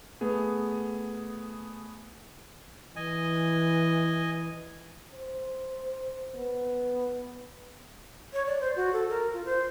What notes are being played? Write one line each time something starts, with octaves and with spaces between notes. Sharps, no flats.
A3 B3 G#4
E3 D#5 G#5
C5
B3
C#5
D5
C5
F#4
A4
A#4
F4
C5